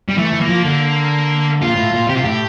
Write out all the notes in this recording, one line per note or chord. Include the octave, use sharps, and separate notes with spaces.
G3
E3 A3
E3
A#3
F3
D3
A#2 F4
A2
A#2
C3 G4
F4
A2 G4